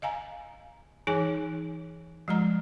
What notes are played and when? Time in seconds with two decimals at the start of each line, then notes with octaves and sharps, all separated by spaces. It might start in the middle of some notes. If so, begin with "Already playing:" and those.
0.02 D#5 F5 G#5 A#5
1.07 E3 D#4 G#4 C#5 G#5
2.28 F3 G#3 D#5 A#5